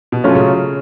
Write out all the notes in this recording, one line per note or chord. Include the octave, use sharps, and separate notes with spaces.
B2
F#3 A3 C#4 F4
C#3